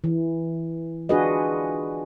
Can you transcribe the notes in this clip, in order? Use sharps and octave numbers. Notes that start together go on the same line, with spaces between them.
E3
D4 F4 F#4 G#4 B4 D#5